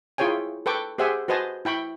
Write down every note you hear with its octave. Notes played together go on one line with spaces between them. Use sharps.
E4 F4 G#4 C#5 G5 G#5
A4 B4 G5 C#6 D6
G4 G#4 C5 E5 F#5 G#5
F#4 B4 C5 D#5 G#5 A5
E4 G5 B5 C#6